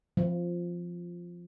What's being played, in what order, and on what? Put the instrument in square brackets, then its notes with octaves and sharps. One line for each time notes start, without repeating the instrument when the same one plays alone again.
[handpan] F3